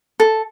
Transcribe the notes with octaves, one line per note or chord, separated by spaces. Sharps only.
A4